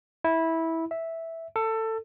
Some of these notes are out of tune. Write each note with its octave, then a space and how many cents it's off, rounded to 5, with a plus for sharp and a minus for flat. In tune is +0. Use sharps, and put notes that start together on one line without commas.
E4 -15
E5 -5
A4 +20